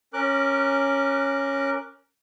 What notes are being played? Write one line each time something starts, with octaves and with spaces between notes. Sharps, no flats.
C#4 A#4 D6 F#6